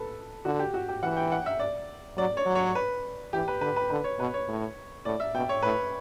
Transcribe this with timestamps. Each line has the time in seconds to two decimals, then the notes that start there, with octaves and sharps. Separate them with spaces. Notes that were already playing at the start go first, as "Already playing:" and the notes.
Already playing: A4 B4
0.45 D3 F#4
0.59 G4
0.74 F#4
0.89 G4
1.03 E3 F#5
1.17 G5
1.32 F#5
1.46 E5
1.59 D5
2.17 F#3 D5
2.37 C#5
2.46 F#3
2.55 C#5
2.75 B4
3.33 E3 G4
3.48 B4
3.61 D3 B4
3.76 B4
3.90 D3 B4
4.04 C#5
4.19 B2 B4
4.34 C#5
4.48 A2
5.05 A2 D5
5.20 E5
5.34 B2 G5
5.49 C#5
5.63 A2 B4